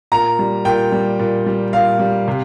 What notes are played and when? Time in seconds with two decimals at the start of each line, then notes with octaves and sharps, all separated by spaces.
0.12 A#2 A#5
0.39 G3
0.65 A#2 G5
0.92 G3
1.19 A#2
1.46 G3
1.73 A#2 F5
1.99 G3
2.28 C3